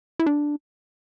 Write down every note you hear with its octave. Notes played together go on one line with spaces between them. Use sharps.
E4
D4